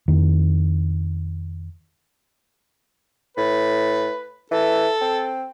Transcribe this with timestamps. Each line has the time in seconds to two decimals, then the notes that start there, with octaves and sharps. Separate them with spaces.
0.08 F2 D#3
3.37 A2 B4
4.52 E3 A4
5.01 C4